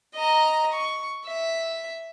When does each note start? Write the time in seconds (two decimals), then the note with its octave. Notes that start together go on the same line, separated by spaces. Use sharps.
0.15 D#5 A#5
0.73 C#6
1.26 E5